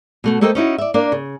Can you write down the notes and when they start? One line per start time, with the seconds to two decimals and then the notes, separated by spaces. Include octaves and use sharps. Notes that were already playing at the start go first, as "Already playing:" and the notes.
0.24 B2 A3 F#4
0.41 A3 A#3 A4 C5 D#5 G5
0.55 C#4 D#4 E4 F#4
0.78 D5 E5
0.94 A#3 D4 A#4 D5 F5
1.12 C#3